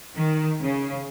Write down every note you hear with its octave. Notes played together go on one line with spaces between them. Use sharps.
D#3
C#3